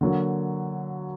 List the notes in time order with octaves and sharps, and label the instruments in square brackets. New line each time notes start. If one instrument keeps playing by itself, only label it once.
[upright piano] D3 F#3 A#3